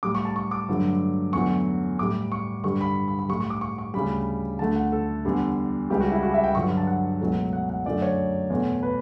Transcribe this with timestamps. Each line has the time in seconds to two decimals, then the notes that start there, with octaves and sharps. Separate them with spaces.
0.03 A2 G3 D6
0.15 C#6
0.25 A5
0.36 C#6
0.51 D6
0.69 G2 D3 F#3 A3
1.33 E2 D3 F#3 A3 C#6
1.99 A2 G3 D6
2.32 C#6
2.63 G2 D3 G3 C#6
2.81 B5
3.08 B5
3.19 B5
3.29 A2 G3 C#6
3.40 C#6
3.50 D6
3.61 C#6
3.78 C#6
3.94 D2 C#3 G3 B5
4.59 D2 D3 A3 A5
4.75 F#5
4.92 A4
5.25 E2 D3 G3
5.90 C#2 C#3 G3 G4
6.00 F#4
6.12 E4
6.23 F#4
6.34 E5
6.44 G5
6.55 G2 D3 F#3 C#6
6.77 A5
6.87 F#5
7.21 C#2 B2 F#3 A3
7.53 F#5
7.70 F#5
7.86 F#2 D3 F#3 A3 D5
8.02 C#5
8.50 E2 B2 A3
8.83 B4